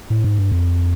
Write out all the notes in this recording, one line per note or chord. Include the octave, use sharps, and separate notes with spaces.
A2
G#2
G2
F2